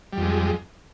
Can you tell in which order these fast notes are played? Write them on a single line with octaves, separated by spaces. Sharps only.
G3 F2 G#3